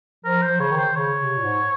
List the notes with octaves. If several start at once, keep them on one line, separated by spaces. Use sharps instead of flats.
F3 A#4
C5
F3
C#3 C#5
D#3
C5
C#3 C#5
C3
A#2
G#2